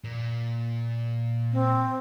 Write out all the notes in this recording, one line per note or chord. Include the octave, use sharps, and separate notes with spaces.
A#2
C4